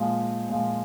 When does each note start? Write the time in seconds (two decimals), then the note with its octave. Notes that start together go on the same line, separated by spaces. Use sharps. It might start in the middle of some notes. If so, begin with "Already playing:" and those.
Already playing: A#2 F3 G#3
0.49 A#2 F3 G#3